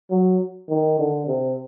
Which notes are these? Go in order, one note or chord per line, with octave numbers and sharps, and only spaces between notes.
F#3
D#3
D3
C3